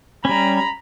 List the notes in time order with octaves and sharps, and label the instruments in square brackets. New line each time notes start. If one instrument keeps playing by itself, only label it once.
[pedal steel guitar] G3 C#4 [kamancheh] A#5 B5